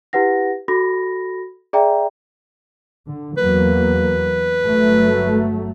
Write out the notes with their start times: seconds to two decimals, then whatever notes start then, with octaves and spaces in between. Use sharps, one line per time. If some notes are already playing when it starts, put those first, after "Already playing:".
0.13 E4 G4 B4 F#5 A#6
0.68 F#4 A4 B5 A#6
1.73 G#4 D5 E5 G5 A#5
3.07 D3
3.37 E2 F#3 A#3 B4
4.64 G1 F#3 A3